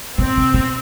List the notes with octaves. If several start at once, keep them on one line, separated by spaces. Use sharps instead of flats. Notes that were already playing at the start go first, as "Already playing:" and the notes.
B2 C4
C3
B2